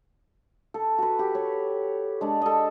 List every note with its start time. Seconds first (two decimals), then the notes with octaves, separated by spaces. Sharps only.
0.74 A4
0.98 F#4 B4
1.19 G4
1.35 C#5
2.21 G#3 D4 A4
2.42 A4 D#5